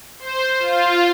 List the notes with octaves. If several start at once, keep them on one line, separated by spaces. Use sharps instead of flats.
C5
F4